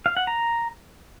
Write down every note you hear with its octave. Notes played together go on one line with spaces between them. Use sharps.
F5
F#5
A#5